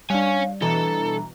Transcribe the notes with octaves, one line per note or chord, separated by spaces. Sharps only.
G3 D4 C#5 F5 G#5
B2 E3 A4 A#5